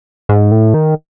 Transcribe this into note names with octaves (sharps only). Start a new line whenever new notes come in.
G#2
A2
D#3